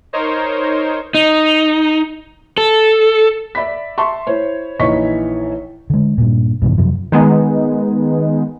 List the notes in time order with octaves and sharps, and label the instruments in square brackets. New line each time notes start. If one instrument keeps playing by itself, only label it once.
[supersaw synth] D#4 A#4 C5 C#5
[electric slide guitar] D#4
A4
[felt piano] D5 E5 B5 B6
E5 A5 C6 C#6
E4 C5 C#5
A#1 E3 D#4 C#5 C#6 B6
[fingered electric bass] D3 G#3
G2 A#2
G2 B2 D#3
F#2 C3 F3
[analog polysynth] D#3 G#3 B3 D#4